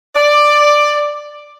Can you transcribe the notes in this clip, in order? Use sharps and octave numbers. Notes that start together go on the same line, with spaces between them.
D5